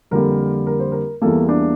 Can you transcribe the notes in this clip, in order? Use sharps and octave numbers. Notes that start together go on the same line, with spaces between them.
F2 D3 G3 A#3 A#4
A#4
C5
A#4
E2 E3 G3 A#3 A4
D4